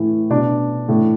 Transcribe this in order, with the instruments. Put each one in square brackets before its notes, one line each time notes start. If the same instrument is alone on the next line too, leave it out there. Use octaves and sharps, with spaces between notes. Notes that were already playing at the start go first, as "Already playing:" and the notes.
Already playing: [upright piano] A2 E3
B2 D4
A2 E3